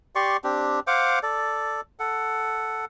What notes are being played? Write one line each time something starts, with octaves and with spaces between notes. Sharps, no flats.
G4 D5 C6 C#6
C4 D4 G4
C5 F5 F#5 D6
A4 D5
A4 F#5